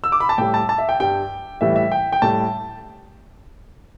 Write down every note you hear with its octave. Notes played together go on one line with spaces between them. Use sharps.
E6
D6
B5
A5
A2 G3 G5
A5
A5
E5
G5
G2 G3 G5
A2 E3 G3 E5
E5
G5
G5
A2 G3 A5